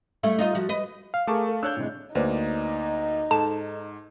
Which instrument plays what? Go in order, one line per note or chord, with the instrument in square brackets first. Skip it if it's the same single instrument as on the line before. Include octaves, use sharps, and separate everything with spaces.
[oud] G3 A3 E4
D#4 F4 D#5
F3 F#4
B4 D#5
[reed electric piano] F5
[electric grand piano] A3 A5 C#6 [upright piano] G#4 A#4 D6
[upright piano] A4
[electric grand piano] D4 C#5 [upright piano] E6 F#6 G6
[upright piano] A2 C3 G#3
[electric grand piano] D2 A#3 [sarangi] D#4 [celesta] B4 C5 D5
[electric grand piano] G#2 [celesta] A4 [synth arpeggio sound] A5